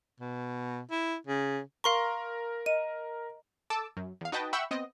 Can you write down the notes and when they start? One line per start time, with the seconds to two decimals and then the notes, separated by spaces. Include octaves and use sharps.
0.20 B2
0.91 E4
1.27 C#3
1.84 A#4 F5 A#5 C6 C#6
2.66 D#5 D#7
3.70 A4 A5 D6 E6
3.97 F#2
4.21 E2 F5
4.32 D#4 F#4 B4 D#5 G5 A5
4.53 E5 F#5 G5 B5 C#6 E6
4.71 B3 C4 D#5